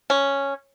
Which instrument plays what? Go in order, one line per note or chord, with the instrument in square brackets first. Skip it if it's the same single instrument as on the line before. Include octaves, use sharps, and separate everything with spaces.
[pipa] C#4